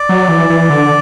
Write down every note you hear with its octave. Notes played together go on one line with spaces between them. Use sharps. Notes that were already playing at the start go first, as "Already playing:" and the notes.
Already playing: D5
F#3
E3
E3
D3